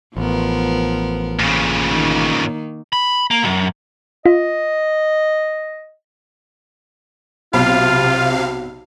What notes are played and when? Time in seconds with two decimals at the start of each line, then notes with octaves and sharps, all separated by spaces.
0.17 A1 F3 B3 A#4
1.40 A#2 C#3
1.92 D#3 A#3
2.93 B5
3.31 A#3
3.43 B1 F#2
4.26 F4 D#5
7.53 B1 C3 F#3 F4 F5 B5